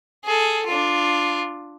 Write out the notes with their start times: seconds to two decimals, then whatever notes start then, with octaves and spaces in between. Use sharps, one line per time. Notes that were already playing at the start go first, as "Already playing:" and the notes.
0.25 G#4 A4
0.66 D4 F4